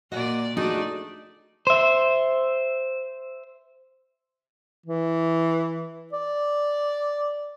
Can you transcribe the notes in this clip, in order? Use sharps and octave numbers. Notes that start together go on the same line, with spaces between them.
A#2 F#4 D5 D#5
A3 D4 D#4 F#4 G#4 D5
C5 E5
E3
D5